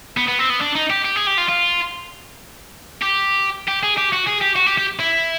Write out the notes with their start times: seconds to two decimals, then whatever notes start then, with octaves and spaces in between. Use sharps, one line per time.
0.17 B3
0.28 B3
0.39 C4
0.50 B3
0.61 D4
0.75 D#4
0.90 G4
1.05 G4
1.16 G#4
1.27 G4
1.37 F4
1.49 F4
3.02 G4
3.68 G4
3.83 G#4
3.97 G4
4.12 F#4
4.27 G#4
4.41 G4
4.56 F#4
4.66 G4
4.78 G4
5.00 E4